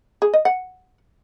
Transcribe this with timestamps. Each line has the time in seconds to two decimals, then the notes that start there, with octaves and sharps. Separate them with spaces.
0.22 G#4
0.34 D#5
0.45 F#5